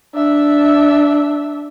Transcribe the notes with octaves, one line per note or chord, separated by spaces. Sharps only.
D4 E5